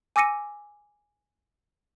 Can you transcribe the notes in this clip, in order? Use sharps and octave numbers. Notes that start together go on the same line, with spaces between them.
G#5 D6 E6 A#6 C#7 D#7